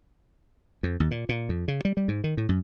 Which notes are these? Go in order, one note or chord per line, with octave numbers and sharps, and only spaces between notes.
F2
D#2
A#2
A#2
F2
C#3
G3
G3
G#2
D#3
A2
F#2